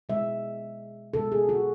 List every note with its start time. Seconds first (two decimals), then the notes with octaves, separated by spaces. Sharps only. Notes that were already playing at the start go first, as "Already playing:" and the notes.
0.09 B2 G#3 E5
1.14 B2 G#3 A4
1.32 G#4
1.49 F#4